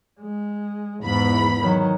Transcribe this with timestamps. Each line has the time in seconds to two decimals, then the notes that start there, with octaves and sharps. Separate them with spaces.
0.21 G#3
1.04 E2 G#2 B5
1.60 D#3 F#3